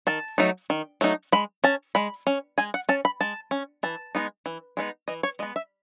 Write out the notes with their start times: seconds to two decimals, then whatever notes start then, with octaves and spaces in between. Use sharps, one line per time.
0.07 D#3 A5
0.38 F#3 A3 D#4
0.70 D#3
1.01 F#3 A3 D#4
1.32 G#3 B5
1.64 C#4 A5
1.95 G#3 B5
2.27 C#4
2.58 G#3 G#5
2.74 F#5
2.89 C#4 A5
3.05 B5
3.21 G#3 A5
3.51 C#4
3.83 E3 A5
4.15 G#3 B3 D#4
4.46 E3
4.77 G#3 B3 D#4
5.08 E3 D#5
5.23 C#5
5.39 G#3 D#5
5.42 B3
5.56 E5